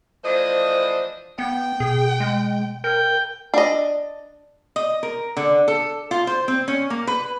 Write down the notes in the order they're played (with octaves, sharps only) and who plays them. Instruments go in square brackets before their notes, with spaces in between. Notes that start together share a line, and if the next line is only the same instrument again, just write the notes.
[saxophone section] E3 F3 A3 D4 C5 D#5
[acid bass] B3 [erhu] G5
[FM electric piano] B2 [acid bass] G#4
[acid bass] G#3
[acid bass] A#4 [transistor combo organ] G5
[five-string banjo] D4 D#5
[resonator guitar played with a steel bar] D#5
A#4
D3
A4
F4
C5
C4
C#4
A#3
B4